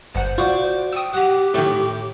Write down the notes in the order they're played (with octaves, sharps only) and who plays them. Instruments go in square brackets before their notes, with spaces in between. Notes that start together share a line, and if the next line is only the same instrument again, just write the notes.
[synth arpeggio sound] G1 F#5 [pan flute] C5
[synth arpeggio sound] F4 [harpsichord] F#4 D5
[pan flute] G5 [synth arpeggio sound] D#6 E6
[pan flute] G4 [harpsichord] F#5
[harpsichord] A2 G5 [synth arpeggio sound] D#3 A3